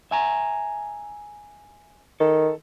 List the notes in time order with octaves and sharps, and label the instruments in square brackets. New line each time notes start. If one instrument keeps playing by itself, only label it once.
[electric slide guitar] E5 G#5 A#5
[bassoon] D#3 [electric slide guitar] A4